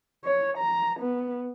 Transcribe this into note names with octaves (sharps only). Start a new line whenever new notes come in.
C#5
A#5
B3